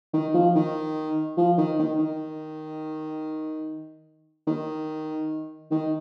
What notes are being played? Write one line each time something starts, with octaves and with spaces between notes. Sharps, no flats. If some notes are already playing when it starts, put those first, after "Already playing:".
D#3
F3
D#3
F3
D#3
D#3
D#3
D#3
D#3